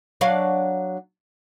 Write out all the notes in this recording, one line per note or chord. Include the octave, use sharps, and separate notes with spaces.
F#3 D4 F5